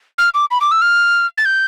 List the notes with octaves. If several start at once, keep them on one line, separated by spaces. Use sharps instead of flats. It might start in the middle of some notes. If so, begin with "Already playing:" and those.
F6
D6
B5
D6
E6
F6
A6
G6